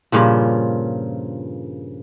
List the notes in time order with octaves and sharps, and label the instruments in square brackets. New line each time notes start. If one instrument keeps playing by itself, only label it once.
[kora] G2 A#2 C#3 F3